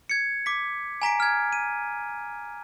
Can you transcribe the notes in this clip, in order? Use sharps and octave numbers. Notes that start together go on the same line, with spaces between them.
G#6 C#7
D6 B6
G#5 A#5 B6 D7
F6 G#6
D#7